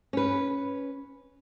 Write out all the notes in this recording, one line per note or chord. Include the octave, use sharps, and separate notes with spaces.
C#4 B4